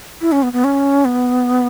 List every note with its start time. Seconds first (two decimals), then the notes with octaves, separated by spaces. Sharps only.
0.21 E4
0.32 C#4
0.43 B3
0.53 B3
0.64 C#4
1.05 B3